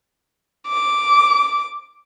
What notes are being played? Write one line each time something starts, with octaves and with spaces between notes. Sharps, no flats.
D6